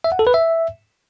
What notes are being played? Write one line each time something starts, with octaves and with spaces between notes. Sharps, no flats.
E5
F#5
A4
B4
E5